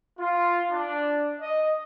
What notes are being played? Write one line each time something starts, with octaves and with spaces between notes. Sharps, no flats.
F4
D4
D#5